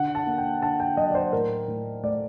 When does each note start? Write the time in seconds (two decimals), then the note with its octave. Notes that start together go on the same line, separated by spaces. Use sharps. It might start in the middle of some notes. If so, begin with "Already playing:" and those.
Already playing: D3 F#5
0.15 A5
0.27 A#3
0.38 G5
0.62 D3 A5
0.80 G5
0.97 F#3 D#5
1.11 D5
1.15 C5
1.32 A2 A#4
1.68 A2
2.03 A3 D5